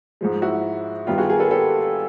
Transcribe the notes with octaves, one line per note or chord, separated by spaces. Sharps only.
G#2 F3 G#3
E4 F#4
G2 D#3 G3 B3 F4 G4
F#4 G#4
G#4 A#4
A4 B4
G4 A4